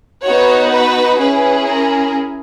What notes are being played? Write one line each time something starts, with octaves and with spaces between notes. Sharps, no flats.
B3 D#4 F#4 C#5
B4
C#4 E4 G#4 B4
A#4